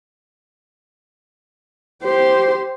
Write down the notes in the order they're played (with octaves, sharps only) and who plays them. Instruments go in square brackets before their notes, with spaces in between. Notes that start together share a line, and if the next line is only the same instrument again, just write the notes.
[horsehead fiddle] G4 C5